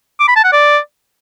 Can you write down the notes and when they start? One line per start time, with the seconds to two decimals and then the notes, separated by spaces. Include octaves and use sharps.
0.20 D6
0.28 B5
0.36 A5
0.44 F#5
0.53 D5